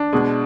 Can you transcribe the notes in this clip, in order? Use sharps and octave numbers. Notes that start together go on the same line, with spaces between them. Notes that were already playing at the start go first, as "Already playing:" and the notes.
Already playing: D4
B2 G#3